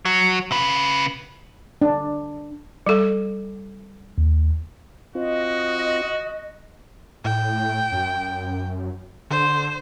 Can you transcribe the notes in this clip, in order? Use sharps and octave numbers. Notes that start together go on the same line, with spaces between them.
F#3
C#3 B4
D4
G3 A4
D#2
C4 F4 F#4 D#5
A2 G5
F#2
D3 C5